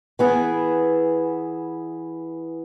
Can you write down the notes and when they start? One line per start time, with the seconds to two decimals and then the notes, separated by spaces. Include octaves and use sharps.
0.19 E3 B3 E4 G#4